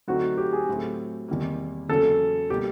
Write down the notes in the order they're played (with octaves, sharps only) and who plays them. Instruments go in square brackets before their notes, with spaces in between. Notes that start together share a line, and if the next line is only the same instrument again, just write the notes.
[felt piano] D3 F#3 A3 C4 D#4 [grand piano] F#4
[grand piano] G4
G#4
[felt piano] A2 F#3 A3 C4
E2 C3 D#3 G3 A#3
[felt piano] E2 C#3 F#3 A#3 C#4 [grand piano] A4
[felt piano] B2 G3 A#3 [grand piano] G4